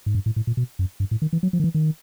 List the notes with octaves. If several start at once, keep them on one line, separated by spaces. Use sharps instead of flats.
G#2
G2
A2
A2
A#2
B2
F#2
G2
A2
D#3
E3
F#3
F3
D#3
E3
D#3